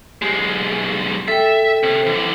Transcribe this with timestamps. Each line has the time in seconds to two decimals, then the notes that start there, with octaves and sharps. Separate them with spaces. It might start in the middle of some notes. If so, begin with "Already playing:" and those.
0.22 B1 G#3 G4
1.28 A4 E5 G5
1.83 C3
2.07 D3 E3